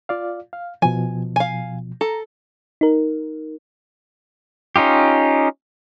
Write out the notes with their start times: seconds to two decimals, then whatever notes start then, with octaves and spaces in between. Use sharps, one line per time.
0.09 F4 D5 F5
0.53 F5
0.82 B2 F3 G#5
1.36 F5 G#5
2.01 A4 A#5
2.81 D#4 A#4
4.76 C#4 D#4 F4 G4